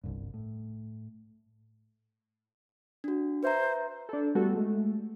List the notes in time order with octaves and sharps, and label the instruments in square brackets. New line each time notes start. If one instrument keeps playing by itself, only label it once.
[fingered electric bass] G1 C2 G2
A2
[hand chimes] D4 F#4
[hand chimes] B4 E5 A#5 [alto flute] C5
[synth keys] D4 A4
G3 A3 B3 F#4 A4
G#3 A3